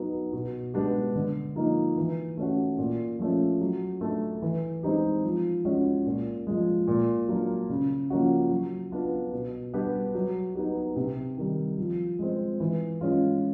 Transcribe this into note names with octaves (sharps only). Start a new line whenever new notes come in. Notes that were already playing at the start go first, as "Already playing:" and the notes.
Already playing: F#3 B3 D#4 F#4
B2
G#3 B3 D4 G4
D3
F3 A#3 D#4
E3
A3 C#4 F#4
A#2
F3 A3 C#4
F#3
A3 D4
E3
G#3 C4 D#4 G4
F3
G#3 C#4 F#4
A#2
F3 G#3
A#2
F#3 A#3 D4 F4
C#3
F3 A#3 C#4 F#4
F#3
B3 D4 F4
B2
G3 B3 D4 G4
F#3
B3 D#4 G4
C3
D#3 G3
F3
G#3 C4
E3
G#3 C#4 F4